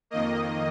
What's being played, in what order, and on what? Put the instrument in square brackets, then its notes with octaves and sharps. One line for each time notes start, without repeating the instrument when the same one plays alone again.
[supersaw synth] F2 D#3 A#3 D#5